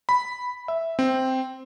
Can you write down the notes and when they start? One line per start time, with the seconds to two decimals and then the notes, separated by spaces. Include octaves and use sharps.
0.09 B5
0.68 E5
0.99 C4